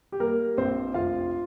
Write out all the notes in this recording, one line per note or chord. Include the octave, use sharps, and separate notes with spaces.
G4
G3 A#3 A#4
A#1 C4 C5
F1 F4 F5